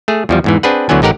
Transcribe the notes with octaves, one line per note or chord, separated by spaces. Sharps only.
A3 G#4
E2 F3 G3
E2 G#2 E3
C4 D4 G#4 B4 F#5
D2 D3 E3 F#3 B3 G#5
A1 D#4 G4 A#4 F#5